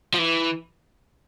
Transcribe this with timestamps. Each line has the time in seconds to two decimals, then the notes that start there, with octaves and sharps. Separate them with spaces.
0.14 F3
0.18 E3